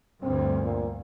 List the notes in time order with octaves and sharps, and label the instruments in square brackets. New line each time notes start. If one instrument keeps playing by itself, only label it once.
[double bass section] D2 G2 [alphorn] C4
[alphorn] A#2